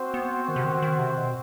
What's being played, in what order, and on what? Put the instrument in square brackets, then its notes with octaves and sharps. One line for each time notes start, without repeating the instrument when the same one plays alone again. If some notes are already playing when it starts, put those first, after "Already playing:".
Already playing: [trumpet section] C4 F#4 C5
[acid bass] B3
D#3
C3
D#3
D#3
C3
B2